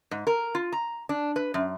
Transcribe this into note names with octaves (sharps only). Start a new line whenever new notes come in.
G#2
A#4
F4
A#5
D4
B4
F#2